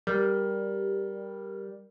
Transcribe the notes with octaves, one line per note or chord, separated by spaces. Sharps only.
G3 A#4